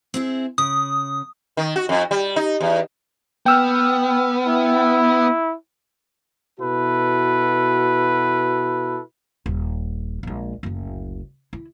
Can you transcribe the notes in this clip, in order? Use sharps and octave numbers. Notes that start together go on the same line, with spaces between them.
C4 E4 G#4
C#3 D#6
D#3
F#4
F2
G3
D#4
E2
B3 G5 E6 F6
E4
B2 E4 F#4 A4 B4
D#1
A#1 G#3
F#1 D2
E4